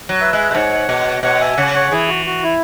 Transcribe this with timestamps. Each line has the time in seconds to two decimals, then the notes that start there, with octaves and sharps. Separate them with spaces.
0.09 F#3
0.21 B4 E5
0.33 G#3
0.51 B2
0.55 G#2 C#5 F#5
0.89 B2
1.23 B2 C#5 F#5
1.40 E5 G#5
1.57 C#3 C#5 F#5
1.74 C#5 F#5
1.91 E3 E4 G#4
2.08 F#4
2.26 F#4
2.43 E4